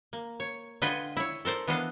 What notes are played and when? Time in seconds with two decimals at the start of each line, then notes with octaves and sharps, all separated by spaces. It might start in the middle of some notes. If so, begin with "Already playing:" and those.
0.13 A#3
0.40 C#5
0.82 D3 F4 B4 D#5 G5 G#5
1.17 E4 C#5
1.45 A4 A#4 C5 D5
1.68 E3 B3 D4 D#5 F5